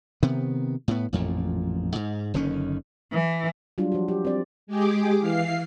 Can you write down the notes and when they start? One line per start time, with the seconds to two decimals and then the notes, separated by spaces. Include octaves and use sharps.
0.23 C3 D#3 B3
0.88 A2 B3
1.13 A1 F2 A#2
1.95 G#2
2.34 F#1 D3 D#3 C#4
3.12 E3
3.78 F#3 G3 D4 F4
3.92 F3 F#4
4.08 G4
4.25 C4 D5
4.67 G#3 G4 G#4 D6
5.19 E3 F5 C7